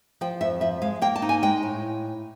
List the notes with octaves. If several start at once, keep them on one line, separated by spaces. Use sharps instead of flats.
F3 G5
F2 E5
F3 E5
G#3 F5
A#3 G5
A5
D#4
G#5
G#3 G5
A2